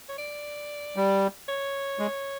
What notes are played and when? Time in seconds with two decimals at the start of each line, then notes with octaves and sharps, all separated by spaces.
0.09 C#5
0.18 D5
0.96 G3
1.48 C#5
1.99 G#3